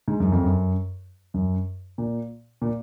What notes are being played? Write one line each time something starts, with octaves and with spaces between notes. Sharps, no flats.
G#2
F#2
F2
F#2
F#2
A#2
A#2